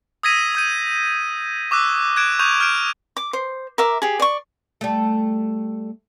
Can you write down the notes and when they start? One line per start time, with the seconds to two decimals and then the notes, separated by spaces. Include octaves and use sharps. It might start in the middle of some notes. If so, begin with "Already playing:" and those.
0.23 D#6 E6 G#6 A#6 B6 D#7
0.55 D#6 G6 D#7
1.71 C#6 D6 E6 F#6
2.16 F#6 G#6 D7 E7
2.39 C#6 D#6 E6 G6 D#7 F7
2.60 F6 G6 D7 E7
3.17 D6
3.33 C5
3.78 A#4 E5 D6
4.02 G4 G#4
4.20 D5 C#6
4.81 G3 A3